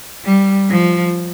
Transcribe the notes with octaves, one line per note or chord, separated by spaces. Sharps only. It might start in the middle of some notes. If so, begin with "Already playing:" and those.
G3
F3